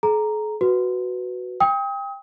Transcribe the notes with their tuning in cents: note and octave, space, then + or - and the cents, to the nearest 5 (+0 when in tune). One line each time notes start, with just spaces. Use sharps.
G#4 +45 A#5 +0
F#4 +0 B4 +0
G5 +25 D#6 +35